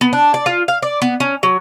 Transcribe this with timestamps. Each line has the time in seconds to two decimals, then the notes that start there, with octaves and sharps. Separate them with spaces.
0.01 B3
0.13 D4
0.34 D5
0.46 F4
0.68 F5
0.82 D5
1.02 B3
1.20 C#4
1.43 F#3